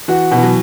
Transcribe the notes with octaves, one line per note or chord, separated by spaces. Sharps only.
E3 F#4
B2 E3
F#3